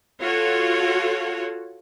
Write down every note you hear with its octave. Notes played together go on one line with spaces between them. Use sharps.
F4 F#4 A4 C#5